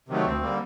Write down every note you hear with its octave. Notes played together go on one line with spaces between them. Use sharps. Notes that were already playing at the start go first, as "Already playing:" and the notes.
C3 D#3 F#3 A3
D2 C4
D3 G3 A#3